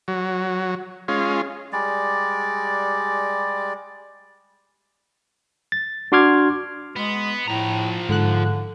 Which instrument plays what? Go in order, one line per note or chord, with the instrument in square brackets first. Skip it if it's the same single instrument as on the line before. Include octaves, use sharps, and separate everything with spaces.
[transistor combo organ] F#3
G#3 C#4 F4
[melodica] G3 G#3 D5
[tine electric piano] A6
D4 F#4 C6 D6 F6 G#6
[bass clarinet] G#3 [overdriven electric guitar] B3
[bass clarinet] A2 [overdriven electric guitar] F3 A#5
[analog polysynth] G#2 F#6 [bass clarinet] D3